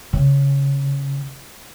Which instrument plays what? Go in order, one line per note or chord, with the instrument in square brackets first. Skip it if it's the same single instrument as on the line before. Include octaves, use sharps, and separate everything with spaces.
[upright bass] C#3